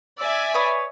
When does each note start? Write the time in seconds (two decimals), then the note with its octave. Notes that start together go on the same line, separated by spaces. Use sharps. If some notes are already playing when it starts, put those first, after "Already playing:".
0.19 D5 E5 G#5 E6
0.54 B4 C#5 D#6